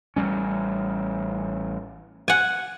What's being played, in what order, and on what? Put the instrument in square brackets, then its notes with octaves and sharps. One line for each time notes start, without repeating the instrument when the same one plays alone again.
[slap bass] A1 G3 C#4
[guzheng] F#5 G#5